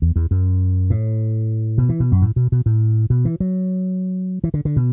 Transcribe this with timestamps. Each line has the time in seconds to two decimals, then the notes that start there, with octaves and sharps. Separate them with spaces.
0.02 E2
0.16 E2
0.31 F#2
0.90 A2
1.78 B2
1.89 E3
2.00 B2
2.12 F#2
2.22 A2
2.36 B2
2.52 B2
2.66 A2
3.10 B2
3.25 E3
3.40 F#3
4.44 E3
4.54 D3
4.65 D3
4.76 B2